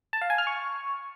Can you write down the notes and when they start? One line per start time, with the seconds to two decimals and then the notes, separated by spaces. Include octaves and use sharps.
0.13 A5
0.21 F5
0.30 G#5
0.38 F6
0.47 C#6